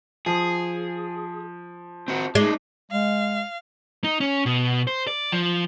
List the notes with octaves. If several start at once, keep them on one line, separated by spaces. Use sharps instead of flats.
F3 G#4
C4 F#4
G#3 D#4 D5
G#3 F5
D#4
C#4
B2
C5
D5
F3